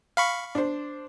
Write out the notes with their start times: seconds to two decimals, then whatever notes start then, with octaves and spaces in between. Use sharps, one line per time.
0.17 F5 B5 C#6
0.55 D4 C5